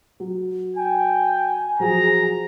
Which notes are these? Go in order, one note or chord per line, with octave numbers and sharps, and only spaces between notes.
F#3
G5 G#5
F3 F#3 G#4 A#5